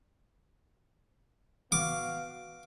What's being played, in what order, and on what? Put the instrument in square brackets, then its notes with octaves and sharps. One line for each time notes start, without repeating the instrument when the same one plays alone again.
[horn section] B3 F#4 F5 [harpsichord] D6